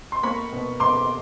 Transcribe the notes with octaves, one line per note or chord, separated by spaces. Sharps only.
C6
A#3 B5 C#6
B2
B2 C6 D6